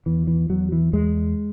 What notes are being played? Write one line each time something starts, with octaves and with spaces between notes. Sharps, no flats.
E2 E3
E3
E2 F#3
E3
E2 G#3